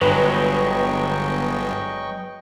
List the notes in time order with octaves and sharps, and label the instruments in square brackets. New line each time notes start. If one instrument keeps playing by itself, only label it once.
[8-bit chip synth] G1 [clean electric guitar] F#3 G#3 [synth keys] B4 [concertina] D#5 G5 C#6